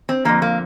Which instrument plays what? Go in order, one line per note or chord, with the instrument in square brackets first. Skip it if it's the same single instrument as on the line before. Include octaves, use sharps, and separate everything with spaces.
[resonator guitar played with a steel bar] C4
F2 D3 F3 A#3
A#3